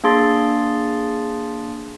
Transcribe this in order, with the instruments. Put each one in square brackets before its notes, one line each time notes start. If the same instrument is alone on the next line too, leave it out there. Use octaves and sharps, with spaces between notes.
[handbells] A#3 D4 G#4 C6 A6